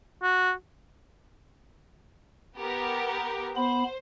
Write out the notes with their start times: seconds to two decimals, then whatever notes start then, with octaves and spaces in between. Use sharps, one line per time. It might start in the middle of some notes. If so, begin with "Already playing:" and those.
0.22 F#4
2.56 B3 G4 A#4
3.56 B3 C5 B5